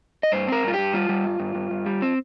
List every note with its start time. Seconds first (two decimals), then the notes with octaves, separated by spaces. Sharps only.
0.23 D#5
0.32 G2 C5
0.47 C4 A#4
0.63 G2 F4
0.74 G2 G4
0.93 G3 F4
1.09 G3
1.24 G2
1.40 G2
1.55 G2
1.71 G2
1.86 G3
2.02 C4